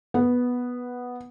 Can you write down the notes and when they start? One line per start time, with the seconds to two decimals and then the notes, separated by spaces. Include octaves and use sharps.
0.14 B3